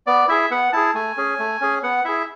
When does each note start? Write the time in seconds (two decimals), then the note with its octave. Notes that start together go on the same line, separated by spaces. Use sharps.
0.07 B3 D5
0.28 E4 G#4 E5
0.51 B3 F#5
0.73 E4 G#4 A5
0.94 A3 G#5
1.17 C#4 G#4
1.39 A3
1.61 C#4 G#4
1.83 B3 F#5
2.05 E4 G#4 E5